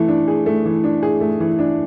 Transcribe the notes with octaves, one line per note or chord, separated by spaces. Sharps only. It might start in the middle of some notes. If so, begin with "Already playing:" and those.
Already playing: E3 A3
D4
G#4
A3
E3
D4
G#4
A3
E3
D4